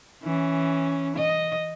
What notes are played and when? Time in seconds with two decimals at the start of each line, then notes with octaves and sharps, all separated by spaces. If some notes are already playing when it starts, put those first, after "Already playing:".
0.23 E3 C#4
1.17 D#5